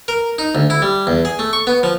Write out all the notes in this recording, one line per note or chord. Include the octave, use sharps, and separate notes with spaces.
A#4
D#4
D2
E4
G3
E2
G#4
A3
C#6
B3
F3